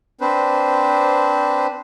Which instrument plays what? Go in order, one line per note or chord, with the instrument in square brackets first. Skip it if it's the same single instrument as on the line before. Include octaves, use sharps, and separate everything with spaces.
[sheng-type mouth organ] C4 D4 B4 C5